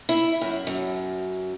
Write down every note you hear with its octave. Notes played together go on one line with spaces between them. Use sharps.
E4
F#2
F#2